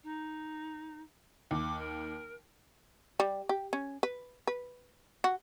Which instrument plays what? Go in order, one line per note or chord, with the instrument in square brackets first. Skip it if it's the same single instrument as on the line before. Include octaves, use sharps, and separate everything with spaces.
[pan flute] D#4
[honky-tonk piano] D#2 [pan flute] D6
[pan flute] A#4
[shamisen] G3
G4
C#4
B4
B4
F#4